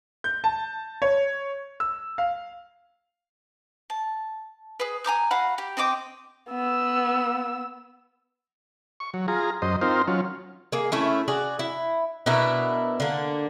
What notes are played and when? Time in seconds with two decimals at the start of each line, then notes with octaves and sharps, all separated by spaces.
0.24 G6
0.44 A5
1.02 C#5
1.80 E6
2.18 F5
3.90 A5
4.80 G#4 B4
5.04 G#5 A#5 D6 G6
5.31 F#4 F5 F#5 B5
5.58 G4
5.77 C4 D#5 G5 D6
6.50 B3 E6
9.00 C#6
9.14 F#3
9.28 F4 G#4 A#5
9.62 F#2 C5 D#5
9.81 C4 D#4 F4 A#4 C5
10.07 F#3 C#4 F4
10.72 A#3 G#4
10.92 A3 C#4 E4
11.28 F#4 G#4 D5
11.59 E4
12.26 B2 D4 E4 A#4
13.00 D3 A#3